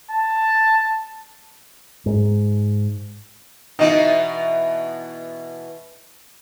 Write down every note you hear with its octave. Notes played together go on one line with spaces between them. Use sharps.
A5
G#2
B2 E3 D#4